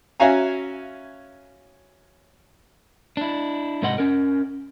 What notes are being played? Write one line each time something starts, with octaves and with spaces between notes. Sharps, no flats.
C#4 F#4 E5 F5 G#5 A#5
D4 E4
G#2 C3 B4 D#5 F#5 C6
C#4 A#4